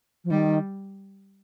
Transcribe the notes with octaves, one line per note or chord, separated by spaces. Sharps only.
F3
D#3 G3